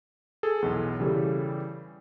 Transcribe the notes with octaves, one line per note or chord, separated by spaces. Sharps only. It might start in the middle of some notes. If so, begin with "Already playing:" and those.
G#4 A4
B1 E2
C#3 E3 G3 A4